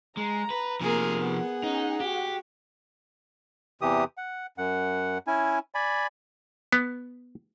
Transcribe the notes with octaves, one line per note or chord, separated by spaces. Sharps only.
G#3 A#5
B4
C3 F3 A#3 G#4 A#4
B3 G#4 F#5
C#4 D#4
F#4 G4
E2 C3 E3 G4 D#6
F#5
F#2 F#5
C#4 E4 G#5
D5 G#5 B5
B3